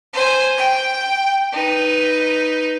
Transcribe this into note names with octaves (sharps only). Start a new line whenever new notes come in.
C5 G#5
G5
D#4 B4